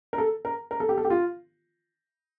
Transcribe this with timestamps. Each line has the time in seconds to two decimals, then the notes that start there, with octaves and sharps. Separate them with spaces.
0.13 A#4
0.18 A4
0.45 A#4
0.71 A#4
0.80 A4
0.89 G4
0.98 A4
1.05 G4
1.10 F4